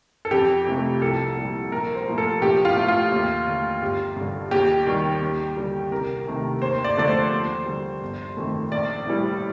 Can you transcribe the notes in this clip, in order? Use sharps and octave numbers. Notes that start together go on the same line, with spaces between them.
A4
F2 G4
C3 F3 A3
C2 A4
A#2 G3
A#1 A#4
C5
A#2 F3 A3
A4
A#1 G4
F4
A2 A3
F4
D#2
D3 A3
G1 G4
G2 D3
D#2 G4
D#3 G3
D#2
D3 G3
C2 A#4
C3 D#3 A3
D#2 C5
D5
D3 F3 A3 D5
C5
D#2
D3 G3
G1
F2 D#3 A3
A#1 D5
A2 G3